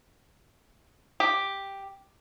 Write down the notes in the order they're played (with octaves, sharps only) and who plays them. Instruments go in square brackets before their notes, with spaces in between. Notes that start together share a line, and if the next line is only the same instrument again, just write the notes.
[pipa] G4